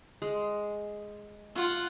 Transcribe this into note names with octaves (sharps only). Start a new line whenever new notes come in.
G#3
F4 F#5